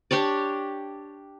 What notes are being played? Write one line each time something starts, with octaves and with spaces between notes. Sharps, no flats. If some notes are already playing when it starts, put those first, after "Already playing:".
D4 G4 C#5 D5